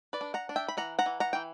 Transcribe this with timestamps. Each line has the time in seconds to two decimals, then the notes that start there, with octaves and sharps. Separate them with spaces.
0.13 B4 D5
0.21 D4
0.34 F#5 A#5
0.49 D4
0.56 E5 G5
0.68 B5
0.77 E3 F#5 A#5
0.99 F#5 A#5
1.06 E3
1.20 F#5 A#5
1.33 E3 G5